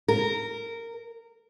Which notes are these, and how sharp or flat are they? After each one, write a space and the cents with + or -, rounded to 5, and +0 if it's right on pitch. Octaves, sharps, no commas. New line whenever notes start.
A#4 -15